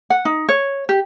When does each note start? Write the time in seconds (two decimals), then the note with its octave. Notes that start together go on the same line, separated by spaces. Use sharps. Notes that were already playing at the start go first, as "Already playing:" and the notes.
0.10 F#5
0.25 D#4
0.49 C#5
0.89 G4